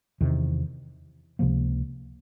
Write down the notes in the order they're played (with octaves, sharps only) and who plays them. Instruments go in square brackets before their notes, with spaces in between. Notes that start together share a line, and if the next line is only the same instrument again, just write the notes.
[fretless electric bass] E2 C3 D#3
C#2 C3 F3 A#3